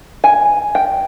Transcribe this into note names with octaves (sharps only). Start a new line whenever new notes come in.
G#5
G5